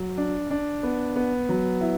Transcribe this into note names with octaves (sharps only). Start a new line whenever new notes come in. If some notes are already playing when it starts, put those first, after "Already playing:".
Already playing: F#3
D4
D4
B3
B3
F#3
E4